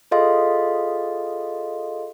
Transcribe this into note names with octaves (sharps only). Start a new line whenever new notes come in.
F4 G#4 A4 D#5 F5 C6